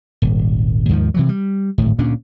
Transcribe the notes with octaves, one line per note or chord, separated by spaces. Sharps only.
D#1 G#1
D#2 G#2 D#3 F3
C3 E3 F#3
G3
D1 G#1 A2
D2 A#2 C#4 D4